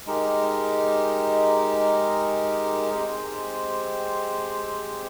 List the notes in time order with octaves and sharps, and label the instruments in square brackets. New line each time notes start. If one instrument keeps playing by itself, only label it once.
[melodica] G#3 D#4 G4 A#4
G#3 C4 G4 C5